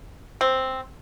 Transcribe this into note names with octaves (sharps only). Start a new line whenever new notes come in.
C4